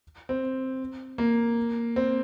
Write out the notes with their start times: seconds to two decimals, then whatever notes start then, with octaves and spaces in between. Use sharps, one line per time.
0.29 C4
1.18 A#3
1.96 C4